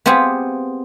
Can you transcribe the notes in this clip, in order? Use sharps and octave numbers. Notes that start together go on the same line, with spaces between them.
B3 C4 F4 G4 G#4